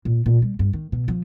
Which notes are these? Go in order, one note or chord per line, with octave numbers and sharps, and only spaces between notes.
A#2
A#2
G3
G2
D#3
B2
F3